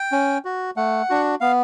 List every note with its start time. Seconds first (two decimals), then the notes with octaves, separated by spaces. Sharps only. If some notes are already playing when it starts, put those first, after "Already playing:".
Already playing: G5
0.12 C#4
0.45 F#4
0.76 A3 F#5
1.10 D4 F#4
1.41 B3 F5